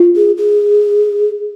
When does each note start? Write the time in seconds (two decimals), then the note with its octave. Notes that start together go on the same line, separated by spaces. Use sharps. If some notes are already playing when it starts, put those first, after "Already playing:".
Already playing: F4
0.16 G#4
0.37 G#4